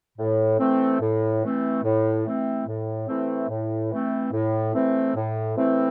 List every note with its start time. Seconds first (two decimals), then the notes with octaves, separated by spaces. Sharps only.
0.18 A2
0.59 E3 A3 C4
1.01 A2
1.42 E3 A3 C4
1.84 A2
2.25 E3 A3 C4
2.67 A2
3.08 E3 A3 C4
3.49 A2
3.90 E3 A3 C4
4.32 A2
4.74 E3 A3 C4
5.15 A2
5.56 E3 A3 C4